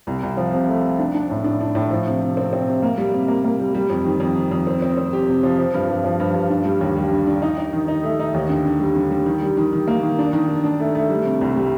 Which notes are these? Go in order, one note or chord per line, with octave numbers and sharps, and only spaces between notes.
C2
C2
F3
C3
A3
C3
D4
D4
A2
D4
D4
A2
F3
C3
C3
C4
C4
C3
A#3
G3
C3
A#3
A#3
G3
G3
F2
D#3
F2
D#3
F2
C4
C4
C4
G4
C3
F3
F3
G2
G2
F3
G2
G2
D4
G3
D#2
G3
D3
D4
D#4
D#4
D#3
D#4
A3
D#4
D#2
D3
D3
G3
D3
G3
D#3
G3
D#3
D#3
A#3
D#3
D4
D#3
D4
D4
A3
A3
G3
C3
C2
G3